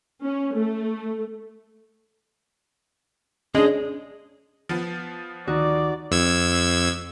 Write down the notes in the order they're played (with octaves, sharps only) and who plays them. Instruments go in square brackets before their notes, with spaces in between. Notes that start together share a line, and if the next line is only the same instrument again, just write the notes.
[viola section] C#4
A3
[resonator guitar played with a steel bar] G#3 [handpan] C#4 D4 [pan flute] G#4
[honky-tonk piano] F3 B3
[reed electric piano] D2 D#3 [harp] D#4 F#4 [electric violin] D5
[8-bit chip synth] F2 E6 G#6